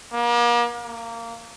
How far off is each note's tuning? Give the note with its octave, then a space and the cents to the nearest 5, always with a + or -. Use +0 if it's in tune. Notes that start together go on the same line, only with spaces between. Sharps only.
A#3 +40
A#3 -15